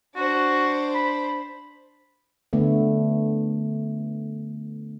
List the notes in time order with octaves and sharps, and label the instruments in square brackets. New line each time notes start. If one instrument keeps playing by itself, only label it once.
[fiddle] D4 C5 [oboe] F#4
[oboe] B5
[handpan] D3 A3 B3